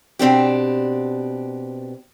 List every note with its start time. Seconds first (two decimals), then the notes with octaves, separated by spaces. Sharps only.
0.19 B2 C4 D4 G4